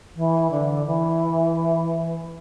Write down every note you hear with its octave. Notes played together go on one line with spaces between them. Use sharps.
E3
D3
E3